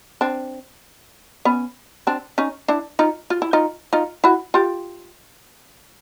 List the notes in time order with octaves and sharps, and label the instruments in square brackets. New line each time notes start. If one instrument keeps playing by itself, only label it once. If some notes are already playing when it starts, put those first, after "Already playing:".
[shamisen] C4 D4
B3 C#4
C4 D4
C#4 D#4
D4 E4
D#4 F4
F4
E4
D#4 F4
D#4 F4
E4 F#4
F4 G4